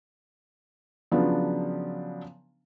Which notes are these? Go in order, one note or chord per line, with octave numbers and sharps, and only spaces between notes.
C#3 F3 F#3 B3 D4